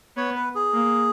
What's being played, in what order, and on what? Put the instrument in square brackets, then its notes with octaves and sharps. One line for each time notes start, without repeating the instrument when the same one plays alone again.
[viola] B3 [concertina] C#5
[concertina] B4
G#4
[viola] A#3